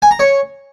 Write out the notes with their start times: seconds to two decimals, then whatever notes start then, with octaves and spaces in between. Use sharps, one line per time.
0.02 G#5
0.11 A#5
0.19 C#5